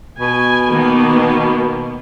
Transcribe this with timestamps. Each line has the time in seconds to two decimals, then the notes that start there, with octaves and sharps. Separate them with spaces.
0.20 B2 G#5
0.70 D#3 A#3 B3